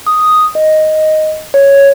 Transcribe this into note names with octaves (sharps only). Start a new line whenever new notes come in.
D#6
D#5
C#5